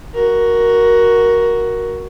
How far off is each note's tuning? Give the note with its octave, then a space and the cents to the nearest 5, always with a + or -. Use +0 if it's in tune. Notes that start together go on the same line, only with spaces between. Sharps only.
F#4 +0 A#4 +10